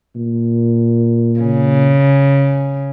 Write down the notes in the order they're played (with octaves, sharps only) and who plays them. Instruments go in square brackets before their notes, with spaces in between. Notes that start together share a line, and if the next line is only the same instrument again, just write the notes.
[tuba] A#2
[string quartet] C#3